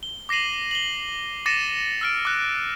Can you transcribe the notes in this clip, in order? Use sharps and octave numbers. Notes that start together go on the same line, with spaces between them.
G7
D6 A#6 C7 D#7 F#7
F#7 G7
D6 A6 A#6 C#7 D#7 E7
E6 F6 D7
D6 F#6